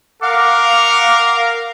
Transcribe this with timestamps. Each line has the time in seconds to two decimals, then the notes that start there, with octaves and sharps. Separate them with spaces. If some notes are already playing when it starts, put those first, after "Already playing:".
0.22 A#4 F5 F#5 D6